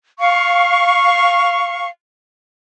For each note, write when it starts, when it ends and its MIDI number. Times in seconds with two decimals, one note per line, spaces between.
0.19 1.88 77
0.19 1.88 85